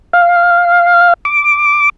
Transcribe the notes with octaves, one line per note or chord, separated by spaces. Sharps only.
F5
D6